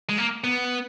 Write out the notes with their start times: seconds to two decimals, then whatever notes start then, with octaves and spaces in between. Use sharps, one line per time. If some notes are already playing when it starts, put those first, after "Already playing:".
0.09 G#3
0.18 A#3
0.44 B3